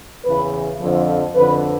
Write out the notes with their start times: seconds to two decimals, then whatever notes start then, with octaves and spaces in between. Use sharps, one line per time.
0.25 E2 C#3 E3 B4
0.80 F2 D3 F3
1.35 F2 D3 F3 B4